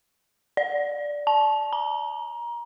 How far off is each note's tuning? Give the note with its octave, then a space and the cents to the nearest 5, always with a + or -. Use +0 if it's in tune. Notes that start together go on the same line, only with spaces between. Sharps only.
D5 -5
A5 -20
A#5 +25